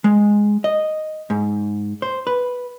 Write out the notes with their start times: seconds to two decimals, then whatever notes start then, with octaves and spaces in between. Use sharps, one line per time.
0.04 G#3
0.64 D#5
1.30 G#2
2.02 C5
2.27 B4